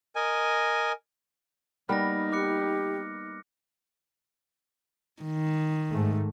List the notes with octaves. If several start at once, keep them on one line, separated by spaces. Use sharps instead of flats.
A#4 D#5 G#5
G3 A#3 B3 D#4 F6 A#6
G4 D6 F#6 C#7
D#3
G#2 A3